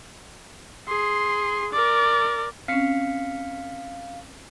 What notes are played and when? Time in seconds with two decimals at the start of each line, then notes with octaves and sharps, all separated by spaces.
0.88 G#4 C6
1.73 A#4 D5
2.68 C4 C#4 F5 B6 C#7